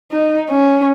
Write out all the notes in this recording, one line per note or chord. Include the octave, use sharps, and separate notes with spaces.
D#4
C#4